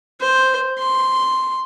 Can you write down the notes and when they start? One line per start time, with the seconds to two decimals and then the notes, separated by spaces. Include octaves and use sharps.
0.21 C5
0.78 C6